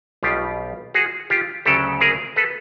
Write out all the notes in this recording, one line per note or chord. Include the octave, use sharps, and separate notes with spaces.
B1 B2 G3 B3 F4 G4
F#4 G#4
F4 G4
D2 C#3 F#3 G4 A4
G#4 A#4
A4 B4